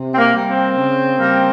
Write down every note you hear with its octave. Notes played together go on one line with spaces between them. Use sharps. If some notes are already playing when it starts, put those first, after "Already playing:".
Already playing: C3
C4
A#3
G3 A#3
C4
C#3
G3 A#3